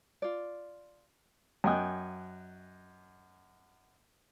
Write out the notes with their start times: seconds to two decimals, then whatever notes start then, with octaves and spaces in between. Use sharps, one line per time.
0.22 F4 D5
1.64 F#2 D#5 G5 G#5 D#6 F#6